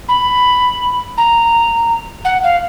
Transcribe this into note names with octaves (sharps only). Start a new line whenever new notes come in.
B5
A#5
F#5
F5